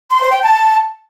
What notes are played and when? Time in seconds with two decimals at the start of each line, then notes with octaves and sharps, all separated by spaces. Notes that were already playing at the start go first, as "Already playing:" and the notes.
0.09 C6
0.20 C5
0.31 G5
0.42 A5